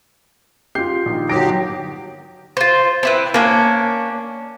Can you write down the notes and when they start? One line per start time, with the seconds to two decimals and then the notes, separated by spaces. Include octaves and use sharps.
0.75 F4 G4 G6 C7
1.06 A#1 D#3
1.29 G1 D#3 F#3 G4 D#6 A#6 D7
2.57 F4 C5
3.03 C4 E4 B4
3.34 A#3 C#4 D4